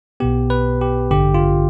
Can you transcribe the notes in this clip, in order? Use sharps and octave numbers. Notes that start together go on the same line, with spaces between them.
B1 B2 B3 G4
B4
G4
A1 G2 D3 G4
F4